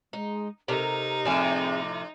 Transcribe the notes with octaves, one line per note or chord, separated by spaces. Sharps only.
G#3 D#4
C3 D#4 A4 A#4
A2 C3 F3 C4 G#4 D5